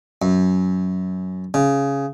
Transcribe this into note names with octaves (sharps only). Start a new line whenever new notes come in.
F#2
C#3